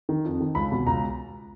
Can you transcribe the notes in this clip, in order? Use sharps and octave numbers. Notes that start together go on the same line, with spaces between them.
D#3
F2
D#3
C#2 B5
B2
C#2 A#5